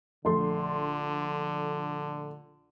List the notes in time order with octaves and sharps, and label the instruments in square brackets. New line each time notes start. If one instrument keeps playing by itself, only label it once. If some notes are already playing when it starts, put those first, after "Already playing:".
[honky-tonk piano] A#1 A3 C6 [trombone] D3